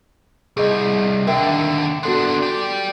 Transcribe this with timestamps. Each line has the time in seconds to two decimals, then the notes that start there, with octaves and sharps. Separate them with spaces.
0.57 C2 G#4 D#5
1.27 D#2 D3 A#4 E5 G5
2.03 B3 D4 F#4 A4 C6
2.42 G4 D5